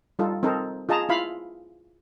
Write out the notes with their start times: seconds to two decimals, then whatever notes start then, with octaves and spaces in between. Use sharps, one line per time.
0.19 G3 D#4 F4 A4
0.43 C4 D#4 A4 A#4 C5
0.89 F4 G#4 D#5 A5 A#5
1.09 E4 F4 F5 B5